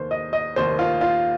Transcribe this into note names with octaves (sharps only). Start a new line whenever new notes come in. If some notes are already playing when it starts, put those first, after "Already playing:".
Already playing: F1 D#2 D#3 C5
D#5
D#5
F1 D#2 D#3 C5
F4
F4